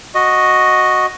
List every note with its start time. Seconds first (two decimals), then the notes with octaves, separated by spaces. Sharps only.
0.15 F#4 D#5